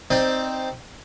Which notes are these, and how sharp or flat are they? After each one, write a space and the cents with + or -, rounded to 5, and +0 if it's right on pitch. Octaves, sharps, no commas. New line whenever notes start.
C4 +0 D#4 +0 D5 +15